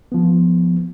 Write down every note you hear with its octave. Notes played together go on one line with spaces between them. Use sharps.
F3 B3